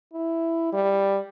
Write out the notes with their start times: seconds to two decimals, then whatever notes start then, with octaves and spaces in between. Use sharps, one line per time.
0.14 E4
0.73 G3